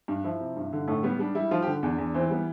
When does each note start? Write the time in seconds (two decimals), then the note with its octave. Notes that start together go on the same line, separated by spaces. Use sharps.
0.08 G2
0.24 F3 E4
0.40 C3
0.57 G2
0.73 D3
0.88 A2 A3
1.03 G3 B3
1.19 G3 D4
1.35 G3 E4
1.51 F3 F4
1.62 G4
1.67 D3
1.83 E2 D4
1.98 E2
2.14 E3 C4
2.30 G3 B3